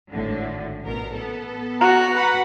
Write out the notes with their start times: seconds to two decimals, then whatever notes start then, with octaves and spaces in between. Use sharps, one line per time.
0.10 G#1 A2 D3
0.83 A1 B2 A#4
1.15 B3 A4
1.81 F#4 A#5
2.12 B4 F#5 B5